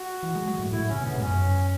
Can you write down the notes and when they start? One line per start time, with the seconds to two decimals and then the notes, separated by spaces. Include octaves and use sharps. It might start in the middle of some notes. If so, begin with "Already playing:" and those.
Already playing: F#4
0.23 E3
0.35 G#3
0.48 F#3
0.60 A2
0.72 A2 E4
0.89 C#3 C#4
1.00 B2
1.05 A2 B3
1.15 G#2
1.22 F#2 C#4